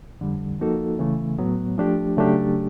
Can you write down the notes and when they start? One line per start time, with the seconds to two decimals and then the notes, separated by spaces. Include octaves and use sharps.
0.21 F2 D3 G3
0.59 F3 A#3 D#4 F#4 A4
0.99 C#3 E3 A3
1.38 A2 F#3 B3
1.78 F3 A3 D4 G4
2.17 C#3 F#3 A3 D4 G4